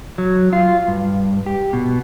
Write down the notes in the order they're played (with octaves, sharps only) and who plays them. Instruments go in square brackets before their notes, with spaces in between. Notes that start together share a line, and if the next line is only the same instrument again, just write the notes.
[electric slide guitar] F#3
F4
G2
G4
B2